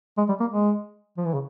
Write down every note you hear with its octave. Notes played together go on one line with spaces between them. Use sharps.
G#3
G3
A#3
G#3
F3
E3
C#3